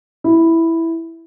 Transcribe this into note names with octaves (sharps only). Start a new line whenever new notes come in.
E4